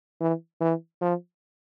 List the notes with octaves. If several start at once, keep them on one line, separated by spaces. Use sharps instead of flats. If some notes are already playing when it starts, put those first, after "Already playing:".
E3
E3
F3